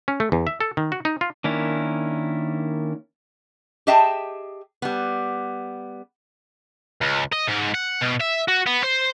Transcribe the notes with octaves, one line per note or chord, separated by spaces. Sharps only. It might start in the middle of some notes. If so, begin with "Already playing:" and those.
C#4
A3
E2
E5
A4
D#3
F#4
D#4
F4
D#3 A#3 C#4 D4 E4
G4 G#4 D#5 E5 G5 A5
G3 B3
C#2
D#5
G#2
F#5
B2
E5
F#4
B3
C5